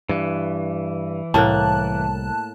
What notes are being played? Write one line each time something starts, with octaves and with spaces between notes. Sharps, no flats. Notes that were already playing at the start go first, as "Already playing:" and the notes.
G2 E3
C2 A2 A#3 A5 F#6